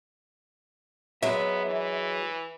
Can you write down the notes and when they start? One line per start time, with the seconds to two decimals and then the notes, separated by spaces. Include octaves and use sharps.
1.22 F#3 G#3 B3 E5
1.66 E3